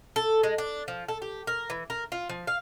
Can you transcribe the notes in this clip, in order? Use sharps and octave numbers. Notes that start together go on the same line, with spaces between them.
A4
G#3
D4
F3
A4
G4
A#4
E3
A#4
F4
F3
F5